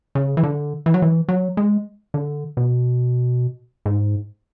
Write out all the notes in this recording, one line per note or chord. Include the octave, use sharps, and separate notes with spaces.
C#3
E3
D3
E3
F#3
E3
F#3
G#3
D3
B2
G#2